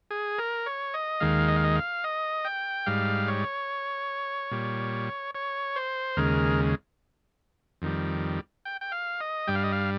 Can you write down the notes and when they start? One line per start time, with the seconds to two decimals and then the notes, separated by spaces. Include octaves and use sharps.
0.11 G#4
0.39 A#4
0.66 C#5
0.94 D#5
1.20 D#2 D#3 G#3 F5
1.48 D#5
1.56 F5
1.64 D#5
1.76 F5
2.04 D#5
2.45 G5
2.86 G#2 G3 F5
3.28 C#5
4.51 A#2 G3
5.35 C#5
5.76 C5
6.17 D#2 C#3 G#3 A#4
7.82 F2 D#3 G3
8.65 G5
8.81 G5
8.92 F5
9.21 D#5
9.47 G2 G3 G5
9.55 F5
9.64 D#5
9.72 F5